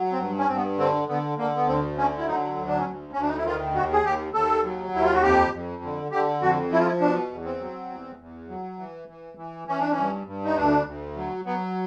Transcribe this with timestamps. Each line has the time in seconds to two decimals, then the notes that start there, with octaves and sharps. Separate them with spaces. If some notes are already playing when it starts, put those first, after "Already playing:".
Already playing: F#3
0.12 C4
0.19 G2
0.38 C#4
0.47 G2 C4
0.56 B3
0.78 D3 C4
1.08 D3 B3
1.38 D3 A#3
1.56 B3
1.67 D2 C4
1.97 D3 C#4
2.18 E4
2.27 F#3 D#4
2.56 D2
2.67 D4
2.79 C#4
2.86 D2
3.13 D2 C#4
3.21 D4
3.28 D#4
3.37 E4
3.45 D#3 F4
3.75 D#2 F#4
3.93 G#4
4.04 D#2 G4
4.34 D#2 A4
4.64 F#3
4.93 D#2 E4
5.04 F4
5.13 F#4
5.23 F2 G4
5.53 F2
5.83 D3
6.11 D3 G4
6.41 F2 F#4
6.71 F3 E4
6.79 F4
6.86 E4
7.00 B2 D4
7.31 E2
7.45 C4
7.60 F#3
7.90 E2
8.19 E2
8.49 F#3
8.79 E3
9.08 E3
9.38 E3
9.68 E3 C#4
9.80 D4
9.91 C#4
9.97 G2
10.27 G2
10.45 D#4
10.56 D2 D4
10.86 D2
11.16 F#3
11.45 F#3 B3